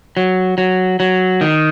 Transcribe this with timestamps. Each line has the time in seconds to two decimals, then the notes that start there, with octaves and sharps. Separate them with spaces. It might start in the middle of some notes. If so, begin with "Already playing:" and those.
0.17 F#3
0.58 F#3
1.00 F#3
1.41 D#3